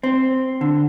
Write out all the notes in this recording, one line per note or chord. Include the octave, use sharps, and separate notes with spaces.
C4
D3